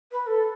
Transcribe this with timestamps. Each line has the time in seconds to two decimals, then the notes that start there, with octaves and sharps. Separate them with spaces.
0.12 B4
0.27 A4